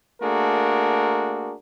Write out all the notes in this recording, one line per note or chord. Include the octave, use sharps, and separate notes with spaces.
A3 A#3 D4 F#4 G#4 A#4